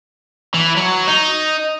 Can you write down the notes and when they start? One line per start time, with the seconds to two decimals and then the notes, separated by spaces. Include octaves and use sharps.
0.54 E3
0.77 F#3
1.07 D#4